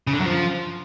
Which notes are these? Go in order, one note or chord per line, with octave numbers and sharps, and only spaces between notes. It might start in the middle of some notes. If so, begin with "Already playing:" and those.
C#3
D3
F#2
F3